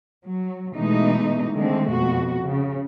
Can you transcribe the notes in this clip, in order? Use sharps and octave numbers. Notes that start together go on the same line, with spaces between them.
F#3
B2 E3 G#3 A3 D#4
D3 D#3 G#3 A3 C4
F2 B2 F#4
C#3